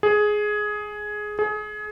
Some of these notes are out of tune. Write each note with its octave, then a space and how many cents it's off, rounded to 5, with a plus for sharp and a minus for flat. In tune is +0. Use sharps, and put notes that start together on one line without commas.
G#4 +10
G#4 +25